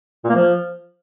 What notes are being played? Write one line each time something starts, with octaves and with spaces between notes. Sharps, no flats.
A#2
A#3
F3